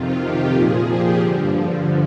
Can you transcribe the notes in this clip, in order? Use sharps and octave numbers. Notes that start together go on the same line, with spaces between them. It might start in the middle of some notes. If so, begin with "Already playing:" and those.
Already playing: F2 C3 D#3 F4
G4
A#2 F3 G#4
G4
G2 D3 F3